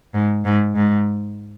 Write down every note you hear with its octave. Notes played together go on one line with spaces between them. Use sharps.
G#2
G#2
G#2